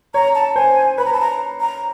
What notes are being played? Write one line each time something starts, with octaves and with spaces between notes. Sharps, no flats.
C#5 A#5
A5
C5 G#5
B4 B5
A#5
A5
A#5
A#5